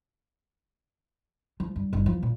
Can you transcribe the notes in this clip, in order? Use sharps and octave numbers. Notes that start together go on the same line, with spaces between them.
F3
G2
G1 D#3
E2 F3
A#2